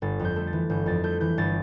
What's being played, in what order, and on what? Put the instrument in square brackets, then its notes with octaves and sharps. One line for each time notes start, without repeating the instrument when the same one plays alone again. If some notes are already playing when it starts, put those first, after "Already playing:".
[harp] G1 A6
F2
G6
A3
A6
E3
G1 G6
F2 A6
A3 G6
E3 G6
G1 A6